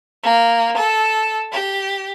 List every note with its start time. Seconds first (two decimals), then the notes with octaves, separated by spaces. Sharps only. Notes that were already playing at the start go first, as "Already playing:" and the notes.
0.23 A#3
0.76 A4
1.51 G4